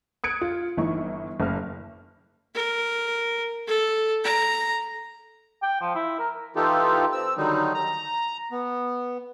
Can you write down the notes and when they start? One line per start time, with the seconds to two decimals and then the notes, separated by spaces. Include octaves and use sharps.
0.24 D#6 F#6 G#6 C#7 D7
0.41 F4
0.77 G1 E3 D#4 C#6
1.40 F#1 F6
2.55 A#4
3.67 A4
4.24 A#5
5.63 G5
5.81 F3
5.95 E4
6.19 A#4
6.56 E3 D#4 F4 G4 A4
7.12 C4 E6
7.37 D3 D#3 F#3 G3 D#4
7.75 A#5
8.52 B3